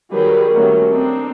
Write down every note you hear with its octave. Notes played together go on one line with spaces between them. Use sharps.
D#3 F#3 G3 G#4 A#4 B4
D#3 F#3 G3 A3 A#3 C#4
C4 D4 D#4 A4